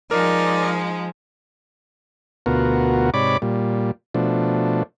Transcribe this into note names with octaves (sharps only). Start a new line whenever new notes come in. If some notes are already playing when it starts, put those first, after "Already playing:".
F3 G#3 D#4 A#4 D5
D2 B2 B3 F4 F#4 A#4
G#2 C3 C#5 D5 B5 D6
A#2 G3
B2 F3 A3 D4